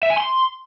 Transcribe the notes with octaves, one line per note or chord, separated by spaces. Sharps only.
E5
G#5
C6